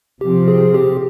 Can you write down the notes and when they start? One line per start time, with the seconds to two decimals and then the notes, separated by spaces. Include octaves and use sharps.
0.20 C3 F3 C4 G4
0.48 G#4
0.74 G4